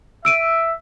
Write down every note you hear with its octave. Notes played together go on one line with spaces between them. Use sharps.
E5 E6 D7 D#7